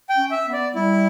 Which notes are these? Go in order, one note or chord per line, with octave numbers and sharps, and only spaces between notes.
G5
C#4
E5
B3
D5
G3 E4